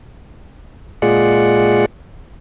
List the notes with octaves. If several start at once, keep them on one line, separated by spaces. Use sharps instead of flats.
A#2 G#3 F4 G#4 D5 F#5